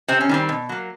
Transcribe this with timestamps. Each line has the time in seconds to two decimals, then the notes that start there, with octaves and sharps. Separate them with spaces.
0.08 C3 C4
0.21 C#4
0.29 D#3 G3 C4
0.49 B2
0.69 F#3 A#3